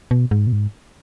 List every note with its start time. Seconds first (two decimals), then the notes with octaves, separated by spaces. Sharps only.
0.11 B2
0.31 G#2
0.47 B2
0.52 G#2